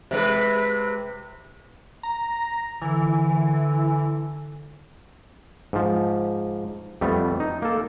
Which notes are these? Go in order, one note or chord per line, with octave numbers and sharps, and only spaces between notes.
C3 G#3 B4
A#5
D3 E3
G#2 F3
F2 G3 A3 B3
D#4
A#3 A4